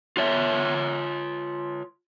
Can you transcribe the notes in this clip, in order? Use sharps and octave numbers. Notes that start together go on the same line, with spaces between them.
F4 C#5 E5